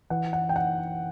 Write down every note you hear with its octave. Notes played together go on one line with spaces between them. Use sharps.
E3 F#5
F#5
G5
F#5